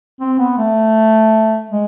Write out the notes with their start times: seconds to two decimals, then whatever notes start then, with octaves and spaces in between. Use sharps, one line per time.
0.20 C4
0.39 B3
0.58 A3
1.71 G#3